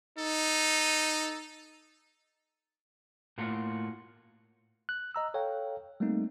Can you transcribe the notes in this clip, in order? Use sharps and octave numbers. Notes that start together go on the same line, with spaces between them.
D#4 A4
A2 A#3 F4 F#4
F#6
D#5 A#5 E6
A4 C#5 F5 G5
G3 A3 A#3 C4 D#4